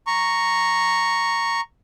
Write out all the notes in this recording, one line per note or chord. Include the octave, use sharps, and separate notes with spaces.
A#5 C#6